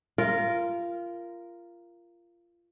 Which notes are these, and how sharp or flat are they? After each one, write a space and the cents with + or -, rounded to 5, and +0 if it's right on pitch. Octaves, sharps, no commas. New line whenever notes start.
F4 -20 A#4 +0